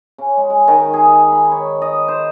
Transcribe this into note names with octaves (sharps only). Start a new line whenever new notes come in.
C#3
G#3
G#3
D#3
G#4
G#4
B5
C#5
D#5
C5